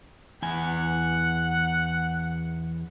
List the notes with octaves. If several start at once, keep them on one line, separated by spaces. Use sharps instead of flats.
E2 F#5 G#5